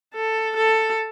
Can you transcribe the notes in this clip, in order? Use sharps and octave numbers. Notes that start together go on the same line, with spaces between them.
A4
A4